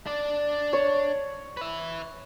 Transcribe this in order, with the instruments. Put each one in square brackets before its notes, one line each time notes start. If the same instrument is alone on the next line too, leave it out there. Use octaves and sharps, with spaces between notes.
[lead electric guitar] D4 D5
[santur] C#5
[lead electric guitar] B4 E5